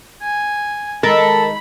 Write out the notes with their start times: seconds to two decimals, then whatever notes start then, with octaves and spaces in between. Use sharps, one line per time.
0.22 G#5
1.03 D#3 G#3 A4 A#4 B5